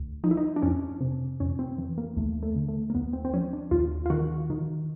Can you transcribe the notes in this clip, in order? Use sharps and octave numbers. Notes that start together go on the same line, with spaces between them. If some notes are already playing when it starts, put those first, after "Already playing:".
Already playing: D2
F3 D#4
E4
D#4
D4
F2 C#4
C3
F2 C#4
C4
E3
A#3
D#2 A3
A3
D3
A3
A#3
D#2 B3
C4
C4
F3 C#4
D4
D#2 F4
F4
D#3 F#4
D#3